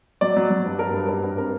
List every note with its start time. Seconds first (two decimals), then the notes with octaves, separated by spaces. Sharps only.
0.21 F#3 D5
0.37 F#3
0.50 F#3
0.66 G2
0.79 G2 A#4
0.94 G2
1.08 G2
1.24 G2
1.38 C4 A#4